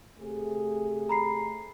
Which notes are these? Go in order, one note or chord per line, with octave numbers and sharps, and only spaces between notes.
C3 A3 G#4
A#5 B5 C7